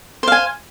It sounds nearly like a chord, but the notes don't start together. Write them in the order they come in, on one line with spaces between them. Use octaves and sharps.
C5 F5 G#5